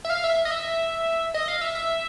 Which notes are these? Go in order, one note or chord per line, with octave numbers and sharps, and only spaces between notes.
E5
F5
E5
D#5
E5
D#5
F5
E5
E5